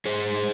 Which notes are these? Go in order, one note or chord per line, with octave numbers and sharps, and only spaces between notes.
G#2 G#4 C5